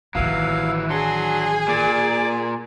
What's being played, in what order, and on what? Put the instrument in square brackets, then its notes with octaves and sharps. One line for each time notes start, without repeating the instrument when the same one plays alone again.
[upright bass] A1 D#3 [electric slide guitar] E3 F#3 [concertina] F5
[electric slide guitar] F#3 [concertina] D4 C6 [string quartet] G#4 G#5
[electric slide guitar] A#2 [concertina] D5 D6